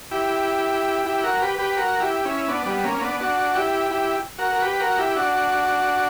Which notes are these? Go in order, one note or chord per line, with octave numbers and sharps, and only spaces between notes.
E4 G4
E4 G4
F#4 A#4
G4 B4
G4 B4
F#4 A#4
E4 G4
C#4 E4
B3 D4
G3 B3
A#3 C#4
C#4
B3 D4
D4 F#4
E4 G4
E4 G4
F#4 A#4
A#4
G4 B4
F#4 A#4
E4 G4
D4 F#4